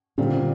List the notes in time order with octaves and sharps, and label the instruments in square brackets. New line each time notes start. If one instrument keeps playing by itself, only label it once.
[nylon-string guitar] A#2 G3 C4 [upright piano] D3